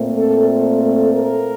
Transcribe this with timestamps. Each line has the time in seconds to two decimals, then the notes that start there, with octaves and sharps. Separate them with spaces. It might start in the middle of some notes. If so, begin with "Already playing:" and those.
Already playing: A#2 A3 C4
0.17 A4
0.50 A4
0.81 A4
1.14 A#4